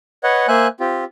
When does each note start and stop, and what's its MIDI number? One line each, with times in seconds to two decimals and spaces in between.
0.24 0.47 71
0.24 0.47 73
0.24 0.47 75
0.24 0.47 78
0.48 0.67 58
0.48 0.67 72
0.48 0.67 76
0.48 0.67 80
0.48 0.67 90
0.80 1.04 60
0.80 1.04 65
0.80 1.04 67